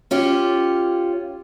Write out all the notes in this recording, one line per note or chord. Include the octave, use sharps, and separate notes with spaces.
C#4 F4 G4